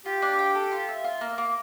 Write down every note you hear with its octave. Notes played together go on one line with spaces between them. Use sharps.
F4 G4
D4
G5
A4
F4
E5
F4
A#3
A#3